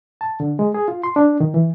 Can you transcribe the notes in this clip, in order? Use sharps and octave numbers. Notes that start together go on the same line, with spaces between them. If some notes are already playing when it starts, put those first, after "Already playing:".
A5
D3
G#3
G#4
F4
C6
D4
D#3
E3